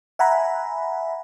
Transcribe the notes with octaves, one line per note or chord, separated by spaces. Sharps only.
E5 F#5 G#5 A#5 B5